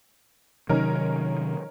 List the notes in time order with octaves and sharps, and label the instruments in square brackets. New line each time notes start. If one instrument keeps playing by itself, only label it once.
[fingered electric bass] C3 D#3 F#3 [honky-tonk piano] C#4 D#4 A#4